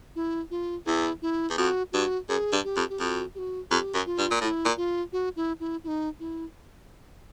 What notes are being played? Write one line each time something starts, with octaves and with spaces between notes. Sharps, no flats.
E4
F4
E2 E4
E4
E2
F2 F#4
G2 F#4
F#2 G#4
G2
G4
F2
G4
F2 F#4 G4
G4
F#4
F2 G4
F#2
F4
G2
A#2
A2 F4
E4
A#2
F4
F#4
E4
E4
E4
D#4
E4